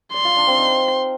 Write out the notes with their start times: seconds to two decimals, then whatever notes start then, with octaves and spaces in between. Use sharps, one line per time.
0.14 D5 C6
0.25 F4
0.36 D4
0.47 C4
0.58 D#4